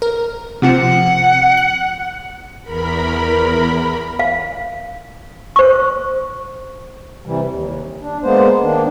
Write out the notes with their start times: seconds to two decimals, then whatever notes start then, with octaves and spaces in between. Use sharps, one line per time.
0.02 A#4
0.62 C3 F3 C4 F#5
1.57 F#6
2.63 E2 A#4 B5
4.19 F5
5.56 C5 C#6
7.26 C3 E3 G3
7.47 D#2
8.01 D4
8.23 G#3 A#3 B3 C5
8.62 D#3 A#3 D4